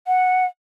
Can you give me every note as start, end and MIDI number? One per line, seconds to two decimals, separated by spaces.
0.07 0.45 78